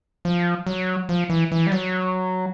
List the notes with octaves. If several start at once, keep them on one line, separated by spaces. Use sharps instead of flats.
F3
F#3
F3
E3
E3
G3
F#3